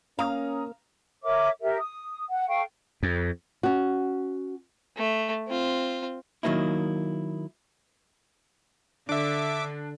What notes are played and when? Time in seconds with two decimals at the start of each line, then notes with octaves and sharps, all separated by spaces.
0.19 A#3 C#4 F5 A#5 D#6
1.23 A#4 C#5 E5 D6
1.61 G4 A#4 E5
1.78 D#6
2.29 F#5
2.48 A4 F5 G5 C#6
3.03 F2
3.63 C#4 F#4
4.96 A3
5.47 C4 F4
6.43 D#3 F#3 A#3 D#4 E4
9.09 D3 D4 E5 D6